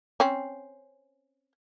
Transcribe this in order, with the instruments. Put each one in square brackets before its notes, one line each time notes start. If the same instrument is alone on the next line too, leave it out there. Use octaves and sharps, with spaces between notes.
[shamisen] C4 C#4